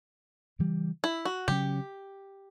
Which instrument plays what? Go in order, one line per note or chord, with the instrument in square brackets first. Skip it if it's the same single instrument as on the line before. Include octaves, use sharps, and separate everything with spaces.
[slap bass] C#3 E3 G3
[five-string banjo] E4
F#4
[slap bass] C#3 F#3 C#4 [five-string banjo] G4